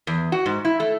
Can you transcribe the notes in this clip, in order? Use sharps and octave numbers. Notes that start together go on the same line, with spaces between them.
E2
F#4
G#2
E4
A3